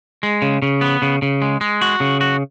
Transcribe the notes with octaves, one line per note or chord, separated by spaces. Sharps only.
G#3
C#3
C#3
B3
C#3
C#3
G#3
G#3
F#4
C#3
F#4